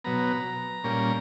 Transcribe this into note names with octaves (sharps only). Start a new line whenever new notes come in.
B2 F#3 B3 A#5
A#2 G3 A#3 C#4